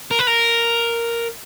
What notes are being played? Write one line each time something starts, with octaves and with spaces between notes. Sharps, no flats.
A#4
B4
A#4